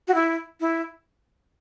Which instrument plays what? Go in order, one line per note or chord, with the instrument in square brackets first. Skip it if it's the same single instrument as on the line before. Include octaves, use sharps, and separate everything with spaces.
[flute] F#4
E4
E4